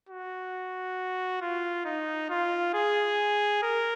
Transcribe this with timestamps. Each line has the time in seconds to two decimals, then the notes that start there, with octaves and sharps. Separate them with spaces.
0.09 F#4
1.42 F4
1.85 D#4
2.30 F4
2.74 G#4
3.62 A#4